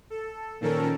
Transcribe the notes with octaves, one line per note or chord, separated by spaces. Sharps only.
A4
A#2 D#3 F3 C#4 A4 A#4